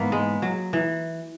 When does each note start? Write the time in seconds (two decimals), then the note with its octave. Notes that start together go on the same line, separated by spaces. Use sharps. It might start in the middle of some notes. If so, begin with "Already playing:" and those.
Already playing: G#2 E3 A#3 B3
0.12 G#3
0.42 F#3
0.73 E3